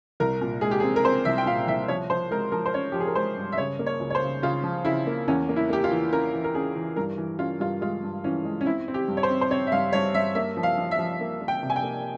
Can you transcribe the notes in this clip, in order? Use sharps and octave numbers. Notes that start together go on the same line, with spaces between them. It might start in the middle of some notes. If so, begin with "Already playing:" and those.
C2 A#4
A#2
G#3 G#4
G4
G#4
C4
A#4
C4 C5
C2 E5
G5
A#2 F5
C2 E5
F3 C#5
F3 C5
G#3 A#4
F3 A#4
C5
C#4 C#5
F3 G4
G#4
A#4
G#3 C5
G2
E5
C#3 C#5
A#3
C#5
C#2
C#5
C5
C#3
C#3 F4
F3
C#3 E4
A#3
E2 C#4
A#3
E4
A#3 G4
F4
E3
C#4 A#4
E3
A#4
C#4 G#4
E3
G2 A#4
E3
C#4 F4
G2 F4
G#3 F4
G2
E3 C#4
G#3
C#4
C4 E4
C4
G4
G2
C#5
C5
C4
C5
C4 C#5
E5
G2 F5
G2 C#5
G2 E5
A#3 E5
F3
F5
F3
E5
F3
A#3
A#3
G5
C3
G#5
G5
A#3